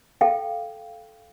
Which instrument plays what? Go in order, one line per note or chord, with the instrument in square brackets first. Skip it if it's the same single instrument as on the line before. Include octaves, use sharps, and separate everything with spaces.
[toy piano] A4 F5 G5